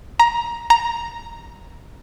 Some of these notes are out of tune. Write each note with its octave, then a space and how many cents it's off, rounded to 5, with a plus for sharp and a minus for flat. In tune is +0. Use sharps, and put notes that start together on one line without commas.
A#5 +15
A#5 +5